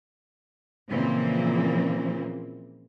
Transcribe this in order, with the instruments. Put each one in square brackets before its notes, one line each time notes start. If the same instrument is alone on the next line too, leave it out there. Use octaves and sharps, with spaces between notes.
[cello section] A#2 C#3 E3 F3 A#3 C4